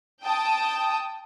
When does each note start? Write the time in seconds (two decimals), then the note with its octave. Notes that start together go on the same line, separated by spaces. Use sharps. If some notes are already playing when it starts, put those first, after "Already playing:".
0.24 G5 A5 D#6